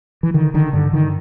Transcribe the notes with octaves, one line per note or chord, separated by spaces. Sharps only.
E3
D3 D#3
D3 D#3
G2 D3
D3 D#3